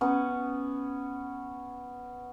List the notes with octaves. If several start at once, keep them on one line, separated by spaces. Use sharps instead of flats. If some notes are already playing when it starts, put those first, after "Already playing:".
B3 C#4